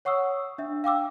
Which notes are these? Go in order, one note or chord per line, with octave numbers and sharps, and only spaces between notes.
C#5 F#5 C#6 D#6 E6
D4 E5
F5 G5 D6 E6